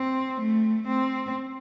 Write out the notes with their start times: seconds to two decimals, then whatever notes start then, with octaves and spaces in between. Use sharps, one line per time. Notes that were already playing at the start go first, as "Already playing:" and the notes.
Already playing: C4
0.41 A3
0.88 C4